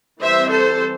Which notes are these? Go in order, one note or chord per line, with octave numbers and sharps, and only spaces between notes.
E3 G3 C4 C5 E5
A4 C5